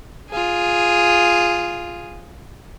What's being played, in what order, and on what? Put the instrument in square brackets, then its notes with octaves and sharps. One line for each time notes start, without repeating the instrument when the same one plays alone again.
[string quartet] F4 G#4